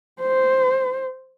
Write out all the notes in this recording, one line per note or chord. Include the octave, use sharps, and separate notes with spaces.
C5